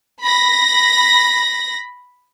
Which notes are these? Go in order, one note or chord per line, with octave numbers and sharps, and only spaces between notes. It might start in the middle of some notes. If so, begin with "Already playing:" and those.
B5 A#6